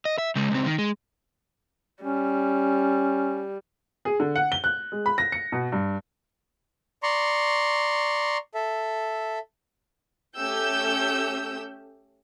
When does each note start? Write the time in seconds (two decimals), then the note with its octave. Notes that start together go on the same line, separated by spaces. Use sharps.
0.05 D#5
0.18 E5
0.36 C#3 G#3
0.51 C#2 C4
0.66 D#3
0.78 G#3
2.03 G3 C#4
4.05 G#4
4.20 D3
4.36 F#5
4.52 G7
4.64 F#6
4.92 G#3
5.06 B5
5.18 A#6
5.32 C#7
5.52 B2
5.72 G2
7.03 D5 A#5 C6 C#6
8.54 A4 E5
10.37 A3 C#4 G4 E6 G6